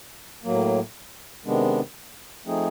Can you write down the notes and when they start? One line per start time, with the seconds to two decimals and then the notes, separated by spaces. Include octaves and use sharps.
0.44 A2 F#3 A#3
1.45 C3 D#3 G#3 B3 D4
2.46 F3 A3 C4 D#4 G#4